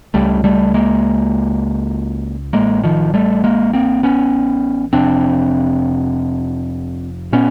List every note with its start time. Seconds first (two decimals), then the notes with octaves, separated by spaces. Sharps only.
0.14 C#2 C#3 G3 A3
0.44 G3 A3
0.74 G#3 A#3
2.53 A1 A2 G#3 A#3
2.84 D#3 F3
3.14 G3 A3
3.44 G#3 A#3
3.73 A#3 C4
4.03 B3 C#4
4.93 F1 F2 C3 C4 D4
7.33 A#2 B3 C#4